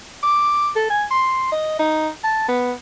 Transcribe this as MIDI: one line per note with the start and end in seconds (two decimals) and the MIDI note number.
0.23 0.69 86
0.76 0.87 69
0.90 1.04 80
1.11 1.48 84
1.52 1.75 75
1.79 2.09 63
2.24 2.47 81
2.49 2.72 59